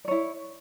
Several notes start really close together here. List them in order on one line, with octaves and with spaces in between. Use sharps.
D5 C#5 E4